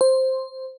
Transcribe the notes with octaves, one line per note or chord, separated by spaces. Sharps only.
C5